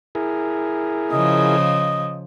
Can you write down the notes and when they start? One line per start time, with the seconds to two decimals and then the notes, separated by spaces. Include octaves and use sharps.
0.15 E4 G#4 A#4
1.12 C#3 F3 D#5